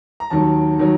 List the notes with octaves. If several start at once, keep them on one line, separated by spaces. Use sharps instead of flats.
A#5
D#2 D#3 F#3 A5
D#3 F#3